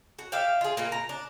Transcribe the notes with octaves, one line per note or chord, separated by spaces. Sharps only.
F#4
D4 E5 F5 G5
F4 G#4
A#2 A#3 F4
A#5
D4